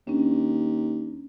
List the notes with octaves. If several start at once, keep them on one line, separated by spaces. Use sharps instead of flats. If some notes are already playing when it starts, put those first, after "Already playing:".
D#2 C#4 D4